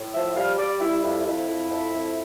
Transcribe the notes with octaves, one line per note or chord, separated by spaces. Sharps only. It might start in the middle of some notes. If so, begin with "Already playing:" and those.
Already playing: A2
F3 E5
G3 F5
G3 D5
G3 E4
F2 E4
F2 E4
F2
F2
F2